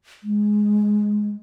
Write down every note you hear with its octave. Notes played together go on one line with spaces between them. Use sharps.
G#3